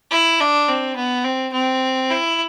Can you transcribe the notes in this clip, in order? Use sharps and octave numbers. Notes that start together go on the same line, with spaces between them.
E4
D4
C4
B3
C4
C4
E4